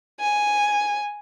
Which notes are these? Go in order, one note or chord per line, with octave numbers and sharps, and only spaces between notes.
G#5